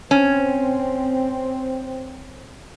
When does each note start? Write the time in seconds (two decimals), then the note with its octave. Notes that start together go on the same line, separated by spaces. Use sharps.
0.11 C4 C#4